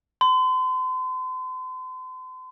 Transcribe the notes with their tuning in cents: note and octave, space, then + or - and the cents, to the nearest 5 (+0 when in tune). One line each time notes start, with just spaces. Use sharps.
C6 -40